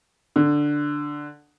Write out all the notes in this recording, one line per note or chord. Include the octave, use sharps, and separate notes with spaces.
D3